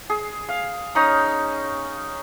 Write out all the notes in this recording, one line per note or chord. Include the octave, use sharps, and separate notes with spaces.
G#4
F5
C#4 D#4 D#6